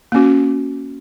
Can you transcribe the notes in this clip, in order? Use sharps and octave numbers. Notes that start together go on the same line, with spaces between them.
A#3 C#4 F#4